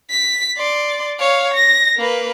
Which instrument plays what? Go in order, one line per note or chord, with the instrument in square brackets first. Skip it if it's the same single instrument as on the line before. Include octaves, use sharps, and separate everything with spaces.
[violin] B6
D5 C6
C#5 F5
A#6
A#3 B4